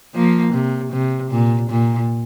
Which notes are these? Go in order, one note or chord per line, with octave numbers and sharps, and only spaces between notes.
F3 A#3
C3
C3
A#2
A#2